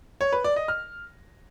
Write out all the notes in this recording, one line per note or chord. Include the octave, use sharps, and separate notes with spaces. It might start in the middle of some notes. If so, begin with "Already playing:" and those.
C#5
B4
D5
D#5
F6